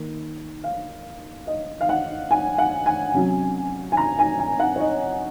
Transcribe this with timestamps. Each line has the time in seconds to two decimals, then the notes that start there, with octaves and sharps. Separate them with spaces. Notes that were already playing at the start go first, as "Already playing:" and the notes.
Already playing: D#3 A#3 D#4
0.64 F5
1.47 D#5
1.81 F5
1.89 F#5
2.31 G#5
2.58 F#5
2.86 G#5
3.14 C3 F#3 C#4
3.92 G#5
3.97 A#5
4.19 G#5
4.39 G#5
4.60 F#5
4.76 C#5
4.80 D#5